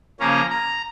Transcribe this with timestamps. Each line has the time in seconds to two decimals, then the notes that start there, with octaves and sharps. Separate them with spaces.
0.20 C#3 F3 A#3 C#4 A#5
0.50 A#5